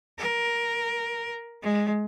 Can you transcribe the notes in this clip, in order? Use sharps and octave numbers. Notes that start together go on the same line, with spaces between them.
A#4
G#3